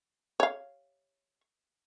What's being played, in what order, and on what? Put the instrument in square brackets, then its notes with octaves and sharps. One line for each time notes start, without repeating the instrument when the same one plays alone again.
[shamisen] C#5 F5